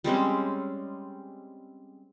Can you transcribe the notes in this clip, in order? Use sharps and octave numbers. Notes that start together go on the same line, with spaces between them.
G3 G#3 C4 C#4